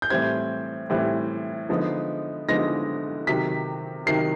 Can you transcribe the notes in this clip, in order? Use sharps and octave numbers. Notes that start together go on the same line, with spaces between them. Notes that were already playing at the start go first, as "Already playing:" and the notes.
G6
A2 E3 G3 C4 G#6
A2 E3 G3 C4
D3 F3 G#3 B3 D#4
D3 F3 G#3 B3 D#4 A#6
C3 D#3 F#3 B6
C3 D#3 F#3 C7